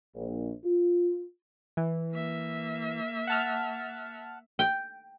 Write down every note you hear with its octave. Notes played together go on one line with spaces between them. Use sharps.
A#1
F4
E3
A#3 E5
F#5 A5 F6
G5